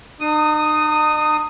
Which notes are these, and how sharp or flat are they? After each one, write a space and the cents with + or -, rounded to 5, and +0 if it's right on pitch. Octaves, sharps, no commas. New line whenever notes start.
D#4 -45 D#6 +0